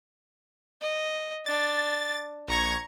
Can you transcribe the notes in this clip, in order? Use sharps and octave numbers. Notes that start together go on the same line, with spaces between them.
D#5
D4 A6
A#1 A#5 C#6 G#6